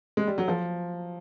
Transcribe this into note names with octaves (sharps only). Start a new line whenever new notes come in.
G#3
G3
F#3
F3